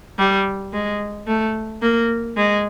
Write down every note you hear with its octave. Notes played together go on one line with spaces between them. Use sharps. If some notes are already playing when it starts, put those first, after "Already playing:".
G3
G#3
A3
A#3
G#3